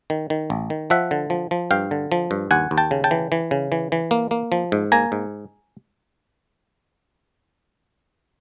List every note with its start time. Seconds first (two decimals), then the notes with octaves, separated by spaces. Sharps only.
0.10 D#3
0.30 D#3
0.50 A1
0.70 D#3
0.90 F3 E5 F#5
1.11 D3
1.30 F3
1.51 F3
1.71 G2 F5 G5
1.91 D3
2.12 F3
2.31 G2
2.51 D#2 F#5 G#5
2.71 D#2
2.77 G5 A5
2.91 C#3
3.04 G5 A5
3.11 E3
3.32 E3
3.51 C#3
3.72 E3
3.92 E3
4.11 A#3
4.31 A#3
4.52 F3
4.72 G#2
4.92 A#3 G#5 A#5
5.12 G#2